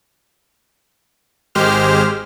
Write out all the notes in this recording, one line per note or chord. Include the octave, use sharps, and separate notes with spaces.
G#1 G#3 G4 C5 F6